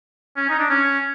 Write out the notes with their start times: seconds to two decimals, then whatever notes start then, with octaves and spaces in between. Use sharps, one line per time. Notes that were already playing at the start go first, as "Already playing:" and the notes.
0.37 C#4
0.49 D#4
0.59 D4
0.70 C#4